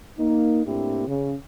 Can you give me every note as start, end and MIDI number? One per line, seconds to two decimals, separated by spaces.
0.19 0.62 58
0.19 0.62 63
0.66 1.05 45
0.66 1.05 58
0.66 1.05 60
0.66 1.05 62
0.66 1.05 64
0.66 1.05 67
1.08 1.33 49